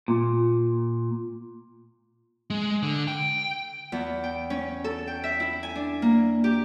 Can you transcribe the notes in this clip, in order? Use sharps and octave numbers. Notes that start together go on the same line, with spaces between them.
A#2
G#3
D3
G5
E2
G5
C#4
A4
G5
E5
E4
G#5
D4
A#3
G4